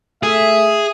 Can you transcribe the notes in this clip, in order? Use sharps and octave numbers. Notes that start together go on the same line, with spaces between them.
A3 G#4 E5